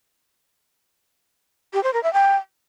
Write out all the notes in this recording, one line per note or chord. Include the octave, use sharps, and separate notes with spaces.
G4
C5
A#4
E5
G5